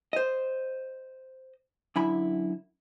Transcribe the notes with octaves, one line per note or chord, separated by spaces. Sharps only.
C5 D#5
F#2 D3 E4 B5